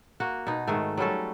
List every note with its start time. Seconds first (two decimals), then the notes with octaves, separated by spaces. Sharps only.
0.20 A#3 F#4
0.47 B2 D#4
0.67 G#2 D#3 A3
0.97 F#3 G3 C#4 A4